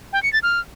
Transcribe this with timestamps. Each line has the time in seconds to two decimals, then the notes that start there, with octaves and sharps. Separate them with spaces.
0.13 G5
0.23 C#7
0.33 A6
0.43 F6